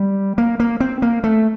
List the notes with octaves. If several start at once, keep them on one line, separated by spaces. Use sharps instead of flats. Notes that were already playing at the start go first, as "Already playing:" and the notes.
Already playing: G3
A#3
A#3
C4
A#3
A3